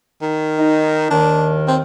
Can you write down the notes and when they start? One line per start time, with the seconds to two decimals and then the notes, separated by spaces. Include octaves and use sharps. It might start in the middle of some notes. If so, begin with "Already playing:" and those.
0.22 D#3
0.58 D#4
1.11 D#2 D#3 D4
1.68 C4